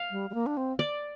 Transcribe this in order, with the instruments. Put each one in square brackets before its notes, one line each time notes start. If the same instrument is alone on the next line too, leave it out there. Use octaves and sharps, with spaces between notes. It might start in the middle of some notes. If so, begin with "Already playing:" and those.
Already playing: [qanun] F5
[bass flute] G3
G3
A#3
D4
C4
[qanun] D5